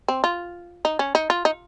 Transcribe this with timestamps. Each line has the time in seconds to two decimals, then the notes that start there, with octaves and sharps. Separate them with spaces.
0.08 C4
0.24 F4
0.85 D#4
0.99 C#4
1.15 D#4
1.30 F4
1.45 D#4